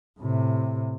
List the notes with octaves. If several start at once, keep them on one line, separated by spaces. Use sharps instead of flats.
A2 C3